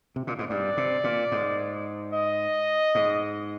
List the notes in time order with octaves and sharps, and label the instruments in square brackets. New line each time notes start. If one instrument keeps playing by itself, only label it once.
[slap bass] C3
A#2
G#2
[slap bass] G2 [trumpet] D5
[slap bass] C3
A#2
G#2
[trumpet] D#5
[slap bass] G#2